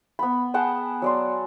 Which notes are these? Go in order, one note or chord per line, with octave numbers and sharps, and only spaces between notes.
B3 B5
G#4 F#5 G5 A5
F#3 D5 C6